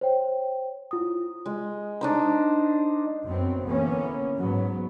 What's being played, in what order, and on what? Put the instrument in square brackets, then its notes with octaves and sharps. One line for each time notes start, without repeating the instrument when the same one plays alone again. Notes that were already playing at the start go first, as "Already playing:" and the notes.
[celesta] C5 C#5 G5
E4 F4 D#6
[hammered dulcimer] G#3
D4 D#4 C5
[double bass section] F#2 B3 C4
D3 E3 A#3 B3 C#4
G#2 F#3 B3